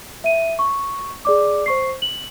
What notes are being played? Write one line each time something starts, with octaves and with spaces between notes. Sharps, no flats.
E5 D#7
C#6
G#4 D5 D6
C5 C#6 C7
F#7